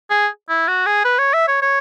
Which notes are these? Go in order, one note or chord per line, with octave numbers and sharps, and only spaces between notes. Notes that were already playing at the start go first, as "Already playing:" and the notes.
G#4
E4
F#4
G#4
B4
C#5
E5
C#5
C#5